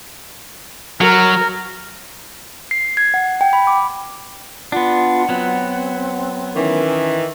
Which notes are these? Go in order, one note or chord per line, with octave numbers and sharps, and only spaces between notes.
F#3 A#4
C7
G#6
F#5
G5
B5
D6
B3 D4 F4 F#5
F#3 B3 C4
D#3 E3 C#4